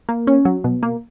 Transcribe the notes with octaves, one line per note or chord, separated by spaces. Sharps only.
A#3
C#4
F#3
B2
A#3